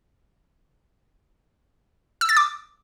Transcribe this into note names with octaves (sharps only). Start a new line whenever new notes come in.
E6
A6
D6